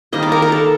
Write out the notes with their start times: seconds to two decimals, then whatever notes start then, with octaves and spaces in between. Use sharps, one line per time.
0.13 D#3 G3 A#3 D#4 D#5
0.23 D5
0.32 A#4
0.42 A#4
0.52 A4